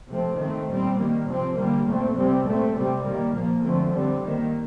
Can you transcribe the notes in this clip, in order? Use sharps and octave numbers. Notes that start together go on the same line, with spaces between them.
C3 F3 A3 C4
D#3 A3 C4
A#2 G3 C4
D#3 G3 A#3
C3 F3 C4
D3 G3 A#3
A#2 A3 C4
C3 G3 C4
A#2 A3 C4
C3 G3 C4
D#3 G3 A#3
A#2 F3 A#3
D3 F3 A3 C4
D3 G3 C4
D#3 A#3